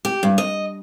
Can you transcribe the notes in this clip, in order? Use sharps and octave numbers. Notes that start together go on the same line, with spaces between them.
G4
G2
D#5